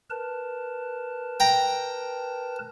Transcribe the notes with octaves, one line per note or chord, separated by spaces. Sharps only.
A#4 B4 A5
G5 A#5